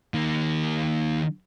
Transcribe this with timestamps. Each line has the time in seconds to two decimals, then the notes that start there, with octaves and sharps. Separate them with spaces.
0.14 D#3 A#3